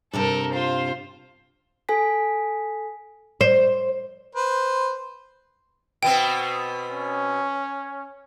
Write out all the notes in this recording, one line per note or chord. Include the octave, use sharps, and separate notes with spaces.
G2 C3 C4 A4 A#4
F4 C5
A4 G#5 B6
C5
B4 C5
B2 B3 C4 G5
C#4